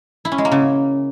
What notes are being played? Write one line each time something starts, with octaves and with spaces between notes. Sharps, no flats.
E4
C#4
G#3
A#3
C#3